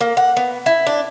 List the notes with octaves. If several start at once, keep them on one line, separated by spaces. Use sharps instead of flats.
A#3
F#5
B3
E4
D4